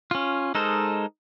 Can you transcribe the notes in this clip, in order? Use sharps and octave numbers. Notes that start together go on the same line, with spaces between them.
C#4 F4
G#3 D#4 A4 A#4 C5